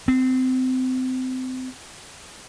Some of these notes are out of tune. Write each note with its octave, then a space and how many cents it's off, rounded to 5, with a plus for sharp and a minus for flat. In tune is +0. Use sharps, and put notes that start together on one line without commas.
C4 -25